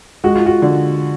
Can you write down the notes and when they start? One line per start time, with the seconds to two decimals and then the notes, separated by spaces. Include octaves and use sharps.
0.24 G#3 F#4
0.35 F4
0.46 F#4
0.62 D3